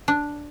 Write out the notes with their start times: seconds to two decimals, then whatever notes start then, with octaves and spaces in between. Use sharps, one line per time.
0.08 D4